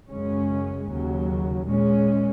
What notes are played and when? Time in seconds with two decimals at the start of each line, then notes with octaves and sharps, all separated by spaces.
0.08 F#2 C#3 G#3 C#4
0.87 D#2 C#3 F#3
1.66 A#2 G#3 C#4